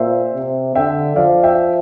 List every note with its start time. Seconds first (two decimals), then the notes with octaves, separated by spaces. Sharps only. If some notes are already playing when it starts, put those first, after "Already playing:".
Already playing: A#2 C5 E5
0.35 C3
0.75 D3 E5 G5
1.16 F3 D5 F5
1.43 E5 G5